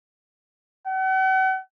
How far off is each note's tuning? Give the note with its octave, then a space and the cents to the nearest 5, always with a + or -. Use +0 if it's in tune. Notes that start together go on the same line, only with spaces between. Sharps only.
F#5 +40